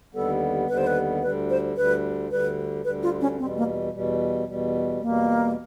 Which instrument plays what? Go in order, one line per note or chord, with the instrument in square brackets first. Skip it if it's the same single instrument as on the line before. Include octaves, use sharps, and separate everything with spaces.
[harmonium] D#2 D3 G3 B3 [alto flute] A4
[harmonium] D#2 D3 G3 B3 [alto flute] B4
[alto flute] C5
B4
[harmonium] D2 D3 G3 [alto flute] B4
[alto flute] C5
[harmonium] D2 D3 G3 [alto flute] B4
[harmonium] D2 D3 G3 [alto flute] B4
[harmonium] D2 D3 G3 [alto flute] B4
[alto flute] F4
C#4
[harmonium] E2 B2 G3 [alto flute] C4
[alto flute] A#3
[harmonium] E2 B2 G3
E2 B2 G3
[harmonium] E2 B2 G3 [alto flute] A#3